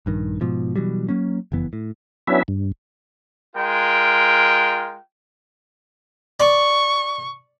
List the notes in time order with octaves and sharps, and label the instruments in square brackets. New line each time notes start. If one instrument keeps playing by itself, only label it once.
[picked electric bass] A#1 G2 D#3
G#2 B2 F3
B2 E3 F#3 G3
F#3 A#3 C#4
F#1 F2 E3 B3
A2
[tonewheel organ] F#3 B3 C#4 D4 E4 E5
G2
[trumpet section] G#3 F4 A#4 G5
[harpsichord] D5 [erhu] C#6